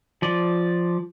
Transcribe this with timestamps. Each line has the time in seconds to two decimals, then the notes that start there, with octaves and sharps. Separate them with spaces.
0.22 F3 D5